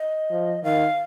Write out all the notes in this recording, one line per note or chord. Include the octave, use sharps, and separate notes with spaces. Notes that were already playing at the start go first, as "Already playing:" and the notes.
Already playing: D#5
F3
D#3 F5